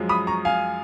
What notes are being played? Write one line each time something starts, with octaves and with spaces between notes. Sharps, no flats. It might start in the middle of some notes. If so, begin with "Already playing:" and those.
Already playing: F#2 F3 G#3
B5 D#6
A#5 C#6
F5 G#5